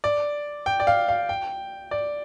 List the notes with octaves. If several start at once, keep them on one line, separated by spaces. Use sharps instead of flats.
D5
G5
D5
F5
F5
G5
D5